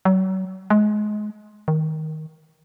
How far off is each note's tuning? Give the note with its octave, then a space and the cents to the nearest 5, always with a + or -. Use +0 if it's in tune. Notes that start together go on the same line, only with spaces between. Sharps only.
F#3 +35
G#3 +25
D#3 +10